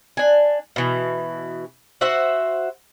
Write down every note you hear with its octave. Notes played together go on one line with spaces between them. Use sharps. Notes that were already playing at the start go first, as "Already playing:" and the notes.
D4 G#5
B2 E3
F#4 C5 E5 F#5